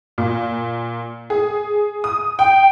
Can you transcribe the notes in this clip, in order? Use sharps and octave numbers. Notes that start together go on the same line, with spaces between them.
A#2
G#4
D#6
G5